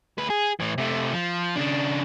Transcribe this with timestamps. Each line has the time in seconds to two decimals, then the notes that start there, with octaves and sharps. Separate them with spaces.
0.18 D2 B4
0.30 G#4
0.60 A2 E3
0.78 C3 A3
1.13 F3
1.56 C#3 D4